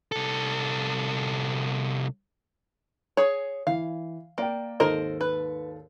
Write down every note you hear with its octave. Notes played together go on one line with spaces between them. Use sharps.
C2 A4
G#4 C#5
E3 F5
A#3 D5 G5
G#1 D#2 A4 A#4 C5 D#5
B4